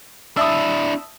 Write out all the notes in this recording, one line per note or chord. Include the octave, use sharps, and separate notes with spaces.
D4 E4 E5 A5 D#6